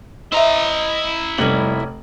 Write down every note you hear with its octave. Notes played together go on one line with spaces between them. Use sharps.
E4 C5 D#5 E5 A#5
F1 F#3 G3 A#3 C#4 F#7